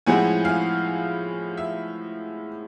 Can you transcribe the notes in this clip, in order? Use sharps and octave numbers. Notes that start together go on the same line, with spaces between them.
A2 F3 G#3 C4 E4 F#5 G#5
F5
E5